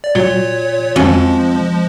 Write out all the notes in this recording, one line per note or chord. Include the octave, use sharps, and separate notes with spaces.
D5
A#2 F#3 C#5
F2 F3 G#3 C#4 F#4